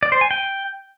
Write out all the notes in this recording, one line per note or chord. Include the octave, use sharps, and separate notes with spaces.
D5
C5
G#5
G5